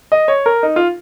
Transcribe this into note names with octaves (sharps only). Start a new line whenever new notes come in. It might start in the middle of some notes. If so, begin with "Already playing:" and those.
D#5
C#5
A#4
D#4
F4